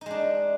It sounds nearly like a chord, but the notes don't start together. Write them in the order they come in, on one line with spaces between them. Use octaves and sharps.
D#4 G#3 D4